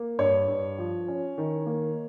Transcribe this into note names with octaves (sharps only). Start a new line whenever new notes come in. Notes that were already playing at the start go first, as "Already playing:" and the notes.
Already playing: A#3
G2 C#5
G2
F3
C#4
D#3
A#3